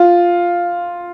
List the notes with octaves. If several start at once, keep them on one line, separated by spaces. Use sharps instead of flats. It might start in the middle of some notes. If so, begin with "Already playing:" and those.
Already playing: F4